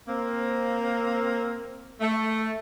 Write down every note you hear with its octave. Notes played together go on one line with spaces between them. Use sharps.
A#3 C4
A3